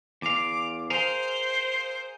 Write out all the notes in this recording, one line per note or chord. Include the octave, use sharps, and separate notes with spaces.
E2 F5 D6
G#4 A#4 C5 F5